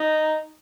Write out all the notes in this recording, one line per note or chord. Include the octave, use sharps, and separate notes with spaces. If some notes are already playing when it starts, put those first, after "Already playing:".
Already playing: D#4